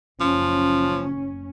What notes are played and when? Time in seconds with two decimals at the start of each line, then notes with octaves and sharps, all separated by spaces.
0.20 F#1 F3 C#4